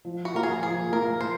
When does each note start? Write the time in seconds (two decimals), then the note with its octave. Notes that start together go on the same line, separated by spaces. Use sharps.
0.05 F3
0.25 F#4
0.34 A#3 F4 A#4
0.43 G#4
0.63 F3 G#4
0.92 A#3 F4 A#4
1.21 F3 C5